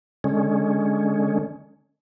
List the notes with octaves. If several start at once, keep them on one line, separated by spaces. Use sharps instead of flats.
D3 G#3 C#4